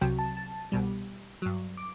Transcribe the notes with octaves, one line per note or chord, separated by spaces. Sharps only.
C2 C3 F#3 G5
A5
A5
C2 B2 G3
G2 F#3
D6